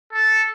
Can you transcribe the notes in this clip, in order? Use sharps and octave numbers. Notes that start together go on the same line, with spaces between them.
A4